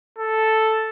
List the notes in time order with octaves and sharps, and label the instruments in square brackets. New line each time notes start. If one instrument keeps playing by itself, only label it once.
[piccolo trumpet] A4